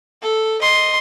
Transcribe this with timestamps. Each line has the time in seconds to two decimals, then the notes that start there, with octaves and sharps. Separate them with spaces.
0.22 A4
0.62 D#5 C6